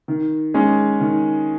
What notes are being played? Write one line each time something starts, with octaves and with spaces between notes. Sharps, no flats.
D#3
G#3 C#4 G#4
D#3